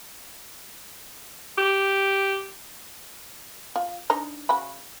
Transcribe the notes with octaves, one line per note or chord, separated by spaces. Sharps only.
G4
F4
D4 D#4 A#5
C#3 F#4 B5